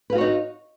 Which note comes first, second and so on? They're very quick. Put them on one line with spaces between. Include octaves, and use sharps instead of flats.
B4 F5 F#4 C#5 D#4